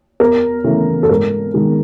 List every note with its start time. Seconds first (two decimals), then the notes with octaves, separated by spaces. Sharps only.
0.20 E2 A#4
0.64 C#3 E3 A3
1.03 A4
1.09 G#2 A#4
1.54 D#3 G#3